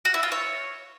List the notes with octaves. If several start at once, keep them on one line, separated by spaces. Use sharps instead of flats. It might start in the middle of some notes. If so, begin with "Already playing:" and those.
F#4
E4
F4
C#5